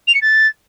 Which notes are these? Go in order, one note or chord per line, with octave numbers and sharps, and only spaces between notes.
F7
C#7
A6